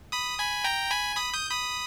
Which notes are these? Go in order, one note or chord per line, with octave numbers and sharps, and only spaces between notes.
B5 D#6
G#5 B5
G5 A#5
G#5 B5
B5 D#6
D#6 G6
B5 D#6